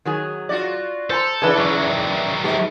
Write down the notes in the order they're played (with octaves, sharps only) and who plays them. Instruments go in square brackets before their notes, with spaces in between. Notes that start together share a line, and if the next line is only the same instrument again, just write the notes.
[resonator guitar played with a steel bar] D#3 F#3 G#4
[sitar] F4 F#4 D5
[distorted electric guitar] A4 [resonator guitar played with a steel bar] C5 G#5 A#5
[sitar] C#3 E3 D4 [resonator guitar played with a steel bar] G#4 B4 D#5
[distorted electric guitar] D#3 F#3
[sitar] G#2 B3 G4